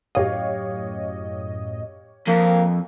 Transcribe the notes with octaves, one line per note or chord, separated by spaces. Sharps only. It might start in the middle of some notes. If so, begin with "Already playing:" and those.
F#2 A2 G4 C#5 D#5 F5
F2 A#3